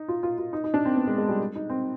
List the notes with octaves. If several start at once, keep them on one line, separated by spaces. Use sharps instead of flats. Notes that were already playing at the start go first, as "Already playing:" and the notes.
Already playing: D#4
F4
F4
F4
D#4
D#4
D4
C4
B3
G#3
G#3
G3
D#4
C4